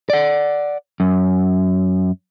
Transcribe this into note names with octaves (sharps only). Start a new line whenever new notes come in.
D5 F#5
F#2